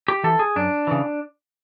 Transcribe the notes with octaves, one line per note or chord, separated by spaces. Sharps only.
G4
E3 A4
G#4
F#2 D4
C#3 E3